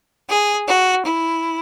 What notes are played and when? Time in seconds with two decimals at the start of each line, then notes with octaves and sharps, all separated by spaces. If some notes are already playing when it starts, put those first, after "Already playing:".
0.28 G#4
0.67 F#4
1.05 E4